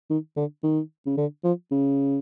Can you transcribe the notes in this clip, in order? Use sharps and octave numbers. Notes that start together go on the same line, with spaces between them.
D#3
D3
D#3
C#3
D3
F3
C#3